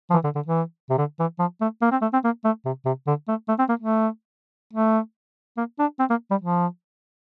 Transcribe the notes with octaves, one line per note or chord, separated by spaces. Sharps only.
F3
E3
D3
D3
E3
C3
D3
E3
F3
A3
A#3
C4
A3
C4
A#3
A3
C3
C3
D3
A3
A3
C4
A#3
A3
A3
A#3
D4
C4
A#3
G3
F3